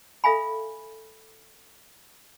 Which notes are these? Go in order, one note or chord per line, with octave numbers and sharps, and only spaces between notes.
A4 E5 F5 G#5 B5